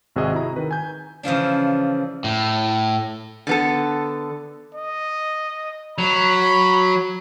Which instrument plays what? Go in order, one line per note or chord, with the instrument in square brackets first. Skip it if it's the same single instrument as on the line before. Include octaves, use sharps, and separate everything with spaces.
[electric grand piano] G#1 C3 F#4 G#4 D#5
E4 A#5
D#3 B4
G#5 G6
[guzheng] C#3 E3 F3 D4
[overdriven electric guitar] A2
[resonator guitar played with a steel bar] D3 B3 A4
[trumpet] D#5
[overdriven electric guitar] F#3 [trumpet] B5